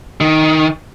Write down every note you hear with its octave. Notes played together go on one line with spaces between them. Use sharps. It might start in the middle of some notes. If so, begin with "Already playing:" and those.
D#3